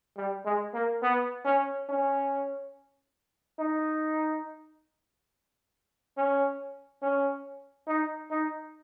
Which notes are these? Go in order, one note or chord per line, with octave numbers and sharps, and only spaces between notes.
G3
G#3
A#3
B3
C#4
C#4
D#4
C#4
C#4
D#4
D#4